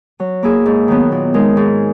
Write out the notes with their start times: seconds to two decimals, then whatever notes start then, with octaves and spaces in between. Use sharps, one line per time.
0.20 F#3
0.43 A#3 E4 G#4
0.66 G#2
0.88 D#3 F#3 B3
1.12 A#2
1.34 G#3 D#4 A#4
1.57 G#2